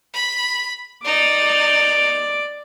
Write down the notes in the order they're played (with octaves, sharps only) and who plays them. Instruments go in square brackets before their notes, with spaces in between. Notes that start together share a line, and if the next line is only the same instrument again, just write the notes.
[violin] B5
[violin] D#4 [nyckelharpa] D5 D6